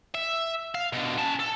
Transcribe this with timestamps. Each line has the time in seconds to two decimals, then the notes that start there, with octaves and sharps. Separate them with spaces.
0.15 E5
0.75 F5
0.93 B2 D3
1.18 C#4 A5
1.39 A4